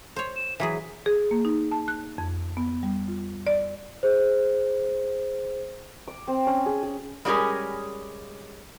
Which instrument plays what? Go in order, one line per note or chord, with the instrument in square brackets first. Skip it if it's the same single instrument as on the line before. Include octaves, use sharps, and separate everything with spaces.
[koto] C5 C#5
[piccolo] E7
[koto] E3 F#3 G#4 [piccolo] B6
[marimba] G#4
A#3
D#4
A5
F#6
F2
B3
G3
F4
D5
[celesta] G#4 C5
[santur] D6
C4
C#4
G#4
G#4
[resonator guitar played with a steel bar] G3 G#3 C#4 G4 G#4 A#4